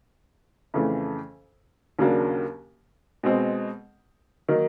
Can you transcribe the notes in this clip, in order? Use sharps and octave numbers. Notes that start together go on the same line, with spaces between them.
F2 C#3 E3 A3
D#2 C#3 F#3 A#3 D4
B2 G#3 C4
D#3 F#3 A#3 D#4